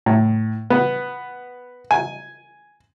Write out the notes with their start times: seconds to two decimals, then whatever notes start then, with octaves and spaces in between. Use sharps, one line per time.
0.06 A2
0.70 B3
1.91 G#5